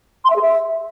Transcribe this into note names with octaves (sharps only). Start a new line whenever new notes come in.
C6
E5
G#4
E5